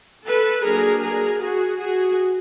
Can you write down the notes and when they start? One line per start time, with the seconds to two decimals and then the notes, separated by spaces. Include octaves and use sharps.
0.25 A4 B4
0.64 F#3 A#3 D4 G#4 A#4
1.03 G#4 A#4
1.42 F#4 G#4
1.80 F#4 G#4